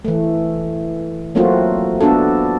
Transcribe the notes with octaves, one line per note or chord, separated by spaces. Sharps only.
E3 A3
F#3 A3 A#3 C4 F4 F#4
B3 D4 F#4 A4